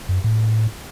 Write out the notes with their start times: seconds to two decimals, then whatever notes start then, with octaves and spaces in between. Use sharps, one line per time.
0.09 F#2
0.24 A2